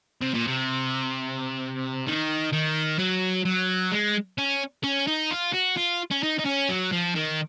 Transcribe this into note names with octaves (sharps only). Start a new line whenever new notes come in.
C3
A#2
C3
D#3
D#3
F#3
F#3
G#3
C#4
C#4
D#4
F4
F#4
F4
C#4
D#4
D#4
C#4
F#3
F3
D#3